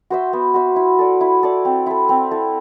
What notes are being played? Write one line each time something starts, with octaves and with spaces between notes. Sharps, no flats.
F#4 C5 E5
B3
F#4 C5 E5
E4
A4 D5
E4
A4 D5
C4
E4 A4
C4
E4 A4